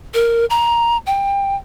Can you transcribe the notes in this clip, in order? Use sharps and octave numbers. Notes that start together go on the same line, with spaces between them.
A#4
A#5
G5